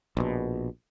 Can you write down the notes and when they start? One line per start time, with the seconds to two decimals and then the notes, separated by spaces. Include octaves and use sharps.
0.17 A#1 B2